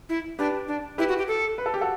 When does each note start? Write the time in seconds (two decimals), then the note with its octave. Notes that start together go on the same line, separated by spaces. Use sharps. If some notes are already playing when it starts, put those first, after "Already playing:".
0.09 E4
0.39 D4 G4 B4
0.68 D4
0.98 E4 G4 B4
1.09 F#4
1.18 G4
1.28 A4
1.58 B4
1.66 A4
1.74 G4
1.81 F#4 A4